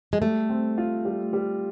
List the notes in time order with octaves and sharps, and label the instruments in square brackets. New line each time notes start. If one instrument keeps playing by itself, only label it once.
[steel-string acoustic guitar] G#3
[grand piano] G3 [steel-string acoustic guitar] A3
[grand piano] C4
F4
G3
G3